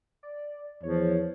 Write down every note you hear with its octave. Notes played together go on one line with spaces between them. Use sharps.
D5
E2 F3 C#5